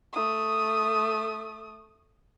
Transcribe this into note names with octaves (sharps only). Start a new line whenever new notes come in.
A3 D#6